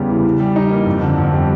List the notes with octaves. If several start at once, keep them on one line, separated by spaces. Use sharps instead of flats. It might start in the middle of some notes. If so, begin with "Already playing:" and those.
Already playing: E2 C#3 G3
E3
E3
G3
D#4
A#3
F2
D3
F2
G3